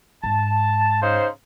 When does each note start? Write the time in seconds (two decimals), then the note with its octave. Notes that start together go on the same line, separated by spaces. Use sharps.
0.24 G#2 A5
1.02 C#3 D#4 C5